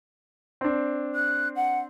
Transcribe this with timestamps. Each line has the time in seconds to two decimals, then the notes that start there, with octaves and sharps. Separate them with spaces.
0.61 C4 D4
1.15 F#6
1.56 F#5